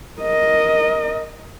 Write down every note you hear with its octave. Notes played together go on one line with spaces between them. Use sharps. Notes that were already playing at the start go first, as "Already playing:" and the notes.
A#4 D#5